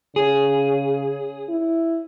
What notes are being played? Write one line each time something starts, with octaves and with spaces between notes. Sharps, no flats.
C#3 G#4
E4